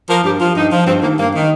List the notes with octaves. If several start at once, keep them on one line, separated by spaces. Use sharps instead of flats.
F3 A#4
G2 G4
F3 F4
G2 D#4
F3
G2 C4
D#3 A#3
G2 A#3
D#3